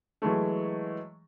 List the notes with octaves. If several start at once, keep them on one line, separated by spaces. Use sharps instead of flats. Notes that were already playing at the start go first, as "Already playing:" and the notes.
E3 F#3 G#3 A3